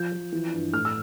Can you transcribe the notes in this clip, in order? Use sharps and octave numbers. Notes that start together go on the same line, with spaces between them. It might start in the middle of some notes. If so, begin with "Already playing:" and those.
Already playing: F3 G6
F3
E3
G2
A2 F6
E6